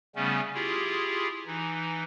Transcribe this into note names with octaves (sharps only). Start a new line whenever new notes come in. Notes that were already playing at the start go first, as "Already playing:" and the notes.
C#3 G3 A3 B3 C#4
E4 F4 G4 G#4
E3 D#4